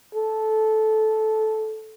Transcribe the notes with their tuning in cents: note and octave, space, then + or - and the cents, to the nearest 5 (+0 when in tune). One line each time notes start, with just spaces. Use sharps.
A4 -15